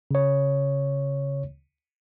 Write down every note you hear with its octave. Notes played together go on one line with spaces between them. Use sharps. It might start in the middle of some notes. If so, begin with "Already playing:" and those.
C#3 C#5